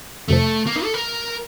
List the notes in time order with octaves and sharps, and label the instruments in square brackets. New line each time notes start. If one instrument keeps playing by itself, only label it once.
[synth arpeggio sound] F2 C3 F3 [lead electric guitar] A3
[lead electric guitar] A#3
D#4
A4
A#4